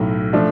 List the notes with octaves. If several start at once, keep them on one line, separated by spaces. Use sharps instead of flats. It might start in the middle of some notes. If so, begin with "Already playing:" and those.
Already playing: B1 A2 F#3
F3 A3 D4